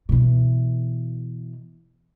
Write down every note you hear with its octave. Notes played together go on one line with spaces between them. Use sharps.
B2 E3